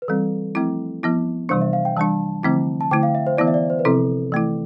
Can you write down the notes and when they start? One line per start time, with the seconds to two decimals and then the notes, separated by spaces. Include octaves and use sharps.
0.02 B4
0.08 E3 G3 C4 A4
0.55 F3 A3 C4 E4
1.03 F3 B3 E4
1.49 C3 E3 G3 D4 C5
1.61 E5
1.73 F5
1.85 G5
1.97 E3 G3 D4 A5
2.43 D3 F3 A3 C4 E4
2.81 A5
2.91 D3 A3 E4 G5
3.03 F5
3.15 E5
3.27 C5
3.37 E3 B3 E4 D5
3.47 E5
3.54 D5
3.70 C5
3.79 B4
3.85 C3 F3 C4 E4 A4
4.32 E3 A3 E4